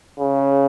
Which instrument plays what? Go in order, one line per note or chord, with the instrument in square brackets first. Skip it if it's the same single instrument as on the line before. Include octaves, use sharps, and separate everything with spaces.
[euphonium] C#3